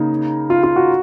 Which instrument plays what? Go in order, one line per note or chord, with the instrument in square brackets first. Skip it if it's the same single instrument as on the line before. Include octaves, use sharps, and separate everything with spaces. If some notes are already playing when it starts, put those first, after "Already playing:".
Already playing: [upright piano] C#3 A#3 [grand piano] D#4
[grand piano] F4
F4
F#4